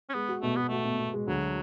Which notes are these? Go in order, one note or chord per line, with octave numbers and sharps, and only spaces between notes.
C#4
G#3 B3
F#4
B2 A3
B3 F#4
A3 F#4
B2
B2
G#3
D2 F#3